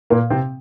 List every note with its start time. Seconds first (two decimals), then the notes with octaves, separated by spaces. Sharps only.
0.10 A#2 A#3
0.30 C3 C4